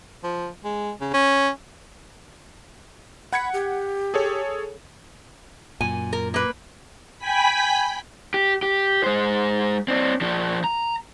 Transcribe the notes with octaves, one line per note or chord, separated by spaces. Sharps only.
F3
G#3
C#3
C#4
F#5 B5 G#6 C#7
G4
G#4 A4 C#5
F#2 A#2 G#5
A#4
A#3 B4
G5 G#5 B5 B6
G4
G4
G#3 C5
C4 D4
F3 D4
A#5